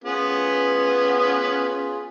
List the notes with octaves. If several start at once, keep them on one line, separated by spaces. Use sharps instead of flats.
B3 C#4 F4 G#4 B4